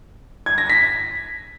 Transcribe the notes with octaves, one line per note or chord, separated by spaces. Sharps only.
G#6
A#6
B6